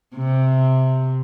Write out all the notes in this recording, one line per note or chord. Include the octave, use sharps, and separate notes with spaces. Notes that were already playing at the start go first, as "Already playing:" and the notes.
C3